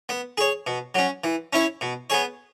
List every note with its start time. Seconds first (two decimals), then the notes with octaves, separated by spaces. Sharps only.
0.09 B3
0.38 G#4 C#5
0.67 B2
0.95 F#3 C#4
1.24 E3
1.53 C#4 E4 C#5
1.81 B2
2.10 B3 G#4 C#5